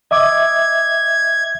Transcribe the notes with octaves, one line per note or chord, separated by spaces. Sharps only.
D#5 E5 D6 G#6